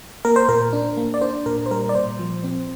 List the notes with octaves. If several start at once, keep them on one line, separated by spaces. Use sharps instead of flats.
A#3 A#4
C5
A#2 A#4
D4
A#3
D5
D4 C5
A#2 A#4
C5
G3 A#4
D5
A#2 C5
F3
C4